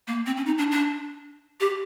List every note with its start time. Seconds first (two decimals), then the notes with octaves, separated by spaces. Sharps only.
0.07 A#3
0.26 C4
0.37 C#4
0.46 D#4
0.58 D4
0.71 D4
1.60 G4